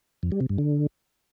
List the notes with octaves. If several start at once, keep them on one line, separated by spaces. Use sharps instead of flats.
F2
G3
C3
G2
D3